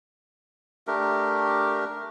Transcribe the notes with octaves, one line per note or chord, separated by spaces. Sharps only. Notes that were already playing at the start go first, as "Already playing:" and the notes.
A3 D4 G4 A#4